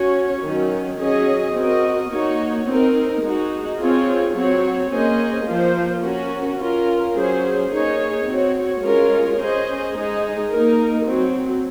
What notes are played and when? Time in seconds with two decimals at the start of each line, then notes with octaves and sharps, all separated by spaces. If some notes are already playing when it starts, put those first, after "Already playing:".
Already playing: C#4 F#4 C#5
0.43 D#3 F#3 C#4
1.00 F#3 C#4 G#4 D#5
1.56 C4 F#4 A#4 D#5
2.12 A#3 D#4 F#4 C#5
2.67 C4 D#4 A#4
3.23 G#3 D#4 F#4
3.80 C4 F4 G#4 C#5
4.35 F#3 C4 F#4 C#5
4.91 A#3 C#4 G#4 C5 D#5
5.46 F3 A#3 F4 C5
6.03 C#4 F#4 A#4
6.58 C#4 F4 A#4
7.15 F#3 C#4 G#4 C5
7.71 A#3 D#4 G#4 C#5
8.26 C4 F#4 C#5
8.83 G#3 C#4 F4 A#4 C#5
9.38 C#4 G#4 C5 D#5
9.94 G#3 D#4 G#4 D#5
10.50 A#3 D#4 A#4
11.06 F#3 C4 F#4